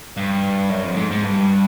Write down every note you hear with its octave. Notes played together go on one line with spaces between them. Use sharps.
G2
F#2
F2
G#2
G#2
G2